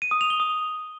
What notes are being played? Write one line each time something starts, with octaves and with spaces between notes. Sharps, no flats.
D#7
D#6
F7
G7
D#6